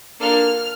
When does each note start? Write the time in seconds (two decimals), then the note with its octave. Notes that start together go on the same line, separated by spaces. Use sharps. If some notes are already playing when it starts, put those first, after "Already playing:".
0.20 A#3 D4 F4 A4 F6